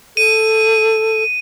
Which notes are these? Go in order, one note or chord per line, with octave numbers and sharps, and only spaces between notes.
A4 D#7